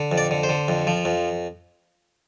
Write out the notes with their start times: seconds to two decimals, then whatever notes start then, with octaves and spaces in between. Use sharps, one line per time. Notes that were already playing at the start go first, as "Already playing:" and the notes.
Already playing: D3
0.12 F2
0.18 D5
0.31 D3
0.43 C5
0.49 D3
0.68 F2
0.87 F3
1.05 F2